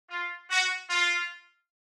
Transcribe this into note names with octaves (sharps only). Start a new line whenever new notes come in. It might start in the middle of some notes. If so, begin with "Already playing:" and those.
F4
F#4
F4